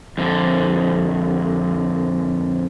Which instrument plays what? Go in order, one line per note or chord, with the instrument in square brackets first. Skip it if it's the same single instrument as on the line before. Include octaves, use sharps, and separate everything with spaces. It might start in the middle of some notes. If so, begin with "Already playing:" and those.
[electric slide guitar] F2 D3